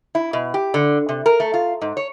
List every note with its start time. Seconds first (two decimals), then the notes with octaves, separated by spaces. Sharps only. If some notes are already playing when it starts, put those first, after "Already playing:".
0.15 E4
0.33 B2
0.54 G4
0.74 D3
1.09 C3
1.26 A#4
1.40 A3
1.54 F4
1.81 G#2
1.97 C#5